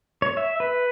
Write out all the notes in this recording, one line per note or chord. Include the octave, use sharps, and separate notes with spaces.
C#5
E5
B4